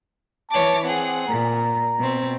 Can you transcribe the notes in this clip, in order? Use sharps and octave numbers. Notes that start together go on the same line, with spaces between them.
E3 C#5 A5 D6
C4 G#4 F#5
A#2 A#5
B2 C4